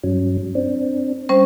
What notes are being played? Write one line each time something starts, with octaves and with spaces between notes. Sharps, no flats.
G2 F#3 C#4
C4 D4
G3 C#4 C5